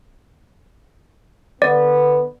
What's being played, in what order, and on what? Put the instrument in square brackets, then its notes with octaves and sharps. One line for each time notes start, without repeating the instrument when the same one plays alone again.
[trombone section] D3 B3 [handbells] D5